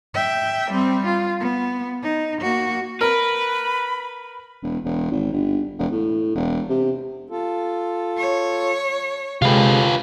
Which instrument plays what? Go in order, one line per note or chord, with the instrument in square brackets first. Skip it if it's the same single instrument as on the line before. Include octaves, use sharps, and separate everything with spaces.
[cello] E5 G5
G3 C4
F4
B3
D#4
A#3 F#4
[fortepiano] A#4 [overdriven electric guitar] B4 [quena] B5
[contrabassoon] E1
E1
G#1
G1
E1
A2
E1
C3
[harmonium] F4 A4
[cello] C#5
[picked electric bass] C3 G#3 [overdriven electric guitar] F4 B4 [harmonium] A4 G5